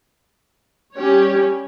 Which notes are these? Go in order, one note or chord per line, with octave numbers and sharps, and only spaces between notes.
G3 C#4 G4 C#5